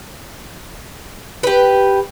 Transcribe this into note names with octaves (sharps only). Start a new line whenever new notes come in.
G4 B4